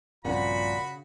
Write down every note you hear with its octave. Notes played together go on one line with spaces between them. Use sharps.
A#1 G2 A#2 C#3 C4 F#4 F#5 B5